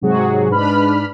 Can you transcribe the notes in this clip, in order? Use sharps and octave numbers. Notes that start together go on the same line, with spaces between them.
G#2 C3 F#3 F#4 G#4
G#2 D4 B4 B5 F6